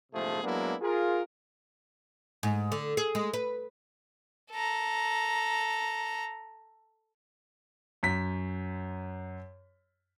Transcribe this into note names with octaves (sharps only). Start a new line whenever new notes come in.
A#1 G#2 C3 F3 A3 G#4
F#3 G#3 A#3 B3 D4 E4
F4 G#4 A#4
G#2
D3
G#4
G#3
B4
A4 A#5
F#2 B6